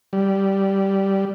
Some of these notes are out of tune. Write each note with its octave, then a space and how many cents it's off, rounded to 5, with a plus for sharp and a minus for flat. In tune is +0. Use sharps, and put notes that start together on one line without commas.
G3 -10